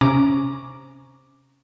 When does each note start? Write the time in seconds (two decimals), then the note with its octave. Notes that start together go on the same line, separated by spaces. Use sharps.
0.01 C3 C#4 A#5 D6